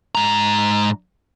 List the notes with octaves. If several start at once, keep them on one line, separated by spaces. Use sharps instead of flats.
G#2 A#5